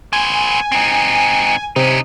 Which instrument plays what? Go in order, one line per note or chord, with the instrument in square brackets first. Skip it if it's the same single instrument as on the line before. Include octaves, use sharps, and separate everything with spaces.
[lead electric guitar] B3 C5 [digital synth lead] G#5
[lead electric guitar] C4 D#4
[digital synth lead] C3 [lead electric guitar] C#4 D#4